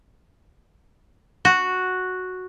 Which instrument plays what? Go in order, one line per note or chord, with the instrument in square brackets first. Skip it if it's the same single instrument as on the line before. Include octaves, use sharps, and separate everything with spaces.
[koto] F#4